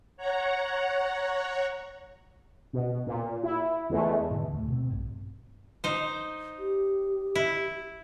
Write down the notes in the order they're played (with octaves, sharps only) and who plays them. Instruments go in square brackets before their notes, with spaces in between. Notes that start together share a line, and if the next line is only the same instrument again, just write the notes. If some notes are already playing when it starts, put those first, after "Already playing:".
[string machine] C#5 F#5 A#5
[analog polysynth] B2
A#2
E4
E2 E3 G#3 A3
[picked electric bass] A2 D3 D#3
D#2 A2 D3
D1 A3
B2 C4
A#1 G2
[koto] D#4 C5
[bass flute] G4
[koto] E4